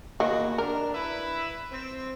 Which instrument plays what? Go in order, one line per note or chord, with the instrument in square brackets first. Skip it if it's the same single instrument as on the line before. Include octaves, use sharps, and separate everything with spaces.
[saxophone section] E2 F#4 [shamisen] D#3 A#3
[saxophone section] D4 [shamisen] A#4
[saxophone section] E4 B4 E5
C4